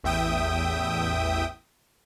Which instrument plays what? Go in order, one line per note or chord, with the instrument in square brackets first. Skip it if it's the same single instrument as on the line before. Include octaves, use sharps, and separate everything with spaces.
[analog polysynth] A1 E2 E5 G5 D#6